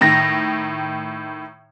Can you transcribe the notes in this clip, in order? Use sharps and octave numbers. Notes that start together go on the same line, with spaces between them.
A2 D#3 A#6